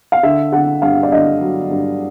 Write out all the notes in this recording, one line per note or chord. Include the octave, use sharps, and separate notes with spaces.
F5
D3 E5
D3 F#5
G2 F5
D5
D3 D#5
F#3
G2